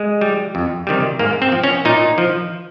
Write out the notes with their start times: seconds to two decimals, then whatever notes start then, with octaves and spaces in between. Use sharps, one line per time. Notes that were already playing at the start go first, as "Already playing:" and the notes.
Already playing: G#3
0.21 G3
0.55 F2
0.87 C3 D#3 G3
1.19 G#2 A#3
1.42 C4
1.52 F3
1.64 C#4
1.85 A#2 D#4
2.18 F3